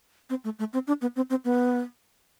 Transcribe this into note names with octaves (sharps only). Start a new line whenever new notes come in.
C4
A3
A3
C4
D4
B3
C4
C4
B3